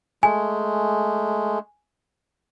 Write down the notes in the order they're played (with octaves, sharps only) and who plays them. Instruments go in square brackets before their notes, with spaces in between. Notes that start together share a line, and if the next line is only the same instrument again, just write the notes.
[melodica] G#3 A3 [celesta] G#5